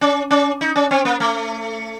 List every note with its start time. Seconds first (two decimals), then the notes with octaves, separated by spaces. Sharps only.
0.01 C#4
0.31 C#4
0.61 D#4
0.76 C#4
0.91 C4
1.05 A#3
1.20 A3